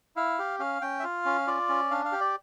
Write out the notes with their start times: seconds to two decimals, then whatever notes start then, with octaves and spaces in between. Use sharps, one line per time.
0.16 E4 F5
0.39 G4
0.59 C#4 F5
0.81 C#4 G5
0.99 E5
1.03 F4 F5
1.25 C#4
1.47 F4 D5
1.69 C#4
1.91 D4 F5
2.05 F5
2.12 G4
2.20 D5